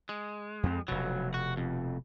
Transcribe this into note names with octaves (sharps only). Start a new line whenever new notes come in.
G#3
F2 C4
F1 B2 F#3
F#4
F2